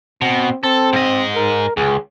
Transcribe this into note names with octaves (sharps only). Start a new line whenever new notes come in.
B2 C4
C4 A4
G#2 D#5
A#4
C#2 G#4